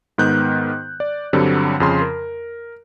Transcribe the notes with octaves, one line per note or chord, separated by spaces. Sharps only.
G#2 D#3 B3 F#6 G6
D5
G2 D3 F#3 G3 C4
F2 C#3 C6
A#4